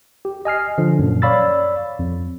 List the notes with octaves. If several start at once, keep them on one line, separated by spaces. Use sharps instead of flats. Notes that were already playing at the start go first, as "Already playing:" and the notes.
G4
D#5 G#5 F6 C7
D3 F3
F#2 A#2
C#5 D5 F5 B5 E6 A6
F2